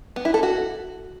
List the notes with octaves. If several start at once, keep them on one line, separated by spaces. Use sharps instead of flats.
B3
E4
A4
F#4